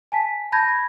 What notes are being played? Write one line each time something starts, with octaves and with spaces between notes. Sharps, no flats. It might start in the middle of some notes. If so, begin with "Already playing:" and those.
G#5 A5 B6
A5 B5 G6 G#6 A#6